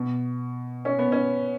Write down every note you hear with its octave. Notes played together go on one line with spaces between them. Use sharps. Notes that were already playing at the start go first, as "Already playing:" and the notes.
Already playing: B2
C#4
B3
C#4